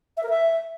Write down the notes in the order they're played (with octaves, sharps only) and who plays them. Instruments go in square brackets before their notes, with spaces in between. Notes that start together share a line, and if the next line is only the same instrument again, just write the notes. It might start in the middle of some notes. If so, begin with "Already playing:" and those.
[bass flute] E5
A#4
E5